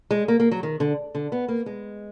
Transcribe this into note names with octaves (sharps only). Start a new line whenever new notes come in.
G#3
A#3
A#3
F#3
D#3
D3
D3
B3
A#3
G#3